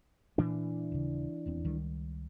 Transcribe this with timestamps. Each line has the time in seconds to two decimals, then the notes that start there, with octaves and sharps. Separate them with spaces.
0.38 A#2 E3 D4
0.92 D#1 C#3
1.46 D#1 E2 C4
1.64 C#2 D#3 G3